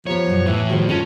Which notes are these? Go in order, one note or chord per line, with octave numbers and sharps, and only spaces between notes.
F3 B3 G4 C#5 A#5
F#2 B2
E2 A2 E3
D#3 F3 G3 F#4 G#4 C5
C4 C#4 F4 F#4 A4